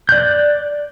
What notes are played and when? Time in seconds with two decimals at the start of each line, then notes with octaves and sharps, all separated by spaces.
0.09 D5 F#6 G6